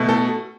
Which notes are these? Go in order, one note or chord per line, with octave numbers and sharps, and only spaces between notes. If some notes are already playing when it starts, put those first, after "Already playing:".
Already playing: B2 A3
A4